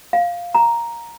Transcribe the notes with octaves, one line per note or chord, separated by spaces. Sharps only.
F5
A#5